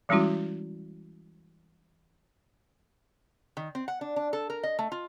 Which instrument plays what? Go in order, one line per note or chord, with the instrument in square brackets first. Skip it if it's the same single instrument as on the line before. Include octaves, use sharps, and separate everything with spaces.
[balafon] E3 G3 G#3 C#4 E4 F#4
[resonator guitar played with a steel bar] D#3
C4
F#5
D4
D4
A4
A#4
D#5
A3
F4